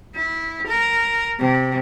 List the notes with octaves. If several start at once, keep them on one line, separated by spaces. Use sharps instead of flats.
E4
A#4
C3